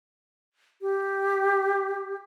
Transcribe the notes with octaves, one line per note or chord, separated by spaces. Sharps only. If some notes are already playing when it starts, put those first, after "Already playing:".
G4